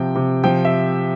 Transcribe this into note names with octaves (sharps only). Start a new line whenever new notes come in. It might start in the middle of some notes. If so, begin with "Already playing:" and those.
Already playing: C3 F3 G5
C3
F3 G5
E5